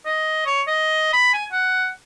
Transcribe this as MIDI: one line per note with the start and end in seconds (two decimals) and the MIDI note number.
0.06 0.45 75
0.46 0.62 73
0.68 1.13 75
1.13 1.33 83
1.34 1.45 80
1.53 1.90 78